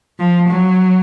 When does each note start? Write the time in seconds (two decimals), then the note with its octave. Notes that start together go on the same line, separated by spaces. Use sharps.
0.19 F3
0.48 F#3